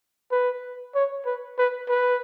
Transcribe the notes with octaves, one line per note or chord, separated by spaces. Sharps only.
B4
C#5
B4
B4
B4